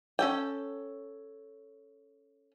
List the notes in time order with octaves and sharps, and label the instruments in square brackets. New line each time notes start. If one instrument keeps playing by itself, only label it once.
[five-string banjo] C#4 A4 G5